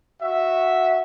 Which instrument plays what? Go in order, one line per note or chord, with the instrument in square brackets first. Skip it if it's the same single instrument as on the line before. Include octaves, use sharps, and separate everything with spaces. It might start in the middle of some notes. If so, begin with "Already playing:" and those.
[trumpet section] F#4 E5